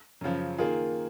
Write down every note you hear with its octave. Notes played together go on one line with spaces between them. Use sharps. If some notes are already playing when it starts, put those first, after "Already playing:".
F#2 C#3 F3
D#3 A#3 F4 G#4